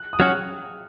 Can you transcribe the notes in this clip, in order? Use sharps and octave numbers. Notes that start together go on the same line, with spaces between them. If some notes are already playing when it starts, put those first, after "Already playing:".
Already playing: F#6
D#6
F#3 C#4 F#4 F6